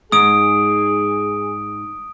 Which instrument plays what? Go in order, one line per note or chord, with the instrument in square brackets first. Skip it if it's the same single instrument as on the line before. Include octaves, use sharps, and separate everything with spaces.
[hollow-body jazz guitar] G#2 [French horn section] G#4 [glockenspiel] D#6 D7